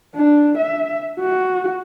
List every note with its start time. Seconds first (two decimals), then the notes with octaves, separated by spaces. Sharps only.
0.15 D4
0.58 E5
1.19 F#4